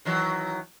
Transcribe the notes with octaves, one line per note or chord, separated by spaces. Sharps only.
D#3 E3 F#3